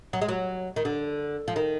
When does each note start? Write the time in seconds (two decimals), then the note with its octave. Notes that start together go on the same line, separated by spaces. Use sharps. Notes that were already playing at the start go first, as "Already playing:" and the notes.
0.13 F#3
0.21 G#3
0.29 F#3
0.76 D#3
0.85 D3
1.48 F3
1.56 D#3